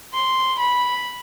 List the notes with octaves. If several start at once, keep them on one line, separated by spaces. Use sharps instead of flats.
C6
B5